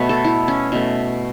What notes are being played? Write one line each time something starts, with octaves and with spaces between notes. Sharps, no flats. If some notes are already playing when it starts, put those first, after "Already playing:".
Already playing: B2 A3 B4 C#5
A4
E4
C#4
B2 A3